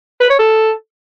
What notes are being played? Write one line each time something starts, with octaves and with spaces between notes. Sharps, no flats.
B4
C#5
A4